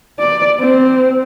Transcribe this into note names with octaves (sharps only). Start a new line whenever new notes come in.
D5
C4